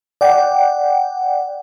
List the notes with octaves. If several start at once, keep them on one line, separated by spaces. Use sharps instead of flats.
D5 F#5 G5